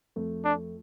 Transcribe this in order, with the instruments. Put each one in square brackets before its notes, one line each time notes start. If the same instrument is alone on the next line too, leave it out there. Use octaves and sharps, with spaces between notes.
[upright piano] F2 F3 A3
[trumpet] D4